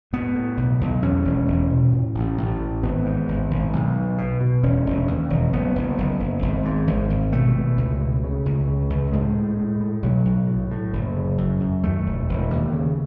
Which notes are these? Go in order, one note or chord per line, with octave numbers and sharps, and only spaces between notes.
A2 B3
A2
B1
B1
E2 C#4
E1
E1
B2
A2
A1
A1
A2
G#1 B3
G#2
G#1
G#1
B1
B2
B2
B2
E1 C#4
E1
D#2
E1
F#1 B3
F#1
F#1
F#1
G#1
G#2
G#1
G#1
B2 A3
B2
C#2
B2
C#3
C#2
C#3
C#2
A2 G#3
A2
A2
A2
B1 F#3
B1
A2
A2
F#1
C#3
F#2
F#2
D#2 A3
E1
E1
D#2
C#3